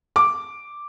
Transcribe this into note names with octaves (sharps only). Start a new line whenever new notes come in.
D6